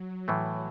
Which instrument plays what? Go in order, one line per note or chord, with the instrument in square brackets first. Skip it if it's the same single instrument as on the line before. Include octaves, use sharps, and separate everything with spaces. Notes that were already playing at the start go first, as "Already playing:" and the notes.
Already playing: [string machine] F#3
[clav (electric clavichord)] A2 E3 A3